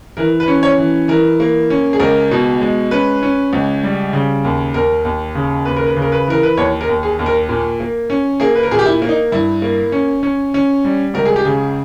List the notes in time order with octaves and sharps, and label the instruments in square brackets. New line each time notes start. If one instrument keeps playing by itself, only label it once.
[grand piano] E3 A#4
B4
C#4
C#5
E3
E3 A#4
A#3
C#4
G#4
C#2 A#4
B2
G#3
C#4 B4
C#4
C#2
G3
C#3
D#2
D#2 A#4
D#2
C#3
D#2 B4
A#4
B4
C#3
A#4
B4
E3 A#4
B4
D#2 C#5
A#4
D#2
G#4
D#2
A#4
A#2
A#3
C#4
A#3 G#4
B4
A#4
A#2 G#4
G4
E4
A#3
D#4
G2 E4
A#3
C#4
C#4
C#4
G3
C#2 A#4
G#4
G4
C#3 G#4